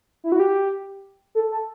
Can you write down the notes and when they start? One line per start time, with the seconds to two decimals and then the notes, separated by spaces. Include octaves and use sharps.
0.24 E4
0.32 F#4
0.40 G4
1.35 A4
1.51 A4